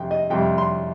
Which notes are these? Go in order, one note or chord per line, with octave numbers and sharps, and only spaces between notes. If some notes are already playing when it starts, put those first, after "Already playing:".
Already playing: F2 C3 G5
D#5
F2 C3 G3 G5
C6